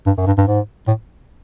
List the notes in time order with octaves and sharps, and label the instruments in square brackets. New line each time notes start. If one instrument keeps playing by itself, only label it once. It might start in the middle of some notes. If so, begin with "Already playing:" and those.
[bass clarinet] G2
F#2
G2
G2
G#2
A2